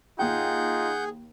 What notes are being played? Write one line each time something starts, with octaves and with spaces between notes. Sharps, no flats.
D#2 D#4 F4 G#4 F#5 G5 G6